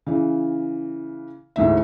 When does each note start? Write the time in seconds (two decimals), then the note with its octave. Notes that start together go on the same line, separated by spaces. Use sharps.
0.07 C#3 E3
1.56 D2 G#2 E3 E5